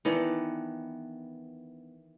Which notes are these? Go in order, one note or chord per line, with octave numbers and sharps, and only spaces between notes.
D#3 E3 B3 D4